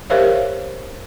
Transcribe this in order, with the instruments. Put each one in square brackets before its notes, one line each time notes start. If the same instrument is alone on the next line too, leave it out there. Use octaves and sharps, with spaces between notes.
[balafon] G4 A#4 C5 C#5 E5 F5